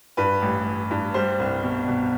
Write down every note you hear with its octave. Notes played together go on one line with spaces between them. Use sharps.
G2 B4
A1
A1
G2
G3 C5
C2
B2
B2